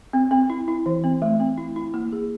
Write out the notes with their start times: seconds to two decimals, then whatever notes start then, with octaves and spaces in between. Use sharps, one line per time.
0.13 C4
0.31 C4
0.50 E4
0.68 E4
0.86 E3
1.04 C4
1.22 A3
1.40 C4
1.58 E4
1.76 E4
1.94 A#3
2.12 G#4